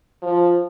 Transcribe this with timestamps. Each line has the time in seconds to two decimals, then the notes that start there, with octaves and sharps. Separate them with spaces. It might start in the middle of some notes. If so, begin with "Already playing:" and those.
0.22 F3